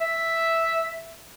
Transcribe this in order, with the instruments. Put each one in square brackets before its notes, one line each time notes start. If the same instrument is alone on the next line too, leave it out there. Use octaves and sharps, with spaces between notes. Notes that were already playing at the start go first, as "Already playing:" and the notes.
[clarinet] E5